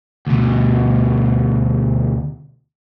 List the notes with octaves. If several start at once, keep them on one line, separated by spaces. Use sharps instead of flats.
D2 B2